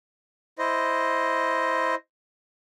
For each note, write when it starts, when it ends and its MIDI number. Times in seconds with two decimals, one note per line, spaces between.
0.59 1.95 64
0.59 1.95 72
0.59 1.95 75